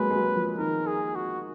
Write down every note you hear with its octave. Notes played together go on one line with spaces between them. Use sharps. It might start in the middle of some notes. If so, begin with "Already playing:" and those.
Already playing: F#3 G#3 A#3 B4
G#3
F#3
F3
D#3 A#4
G#4
F#4